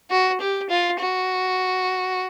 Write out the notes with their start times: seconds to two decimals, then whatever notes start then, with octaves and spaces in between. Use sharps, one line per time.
0.10 F#4
0.40 G4
0.69 F4
0.99 F#4